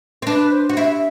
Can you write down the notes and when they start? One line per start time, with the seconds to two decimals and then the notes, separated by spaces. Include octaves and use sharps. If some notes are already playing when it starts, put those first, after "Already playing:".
0.22 C4
0.27 D4 B4
0.52 C5
0.69 F#4
0.77 E4 E5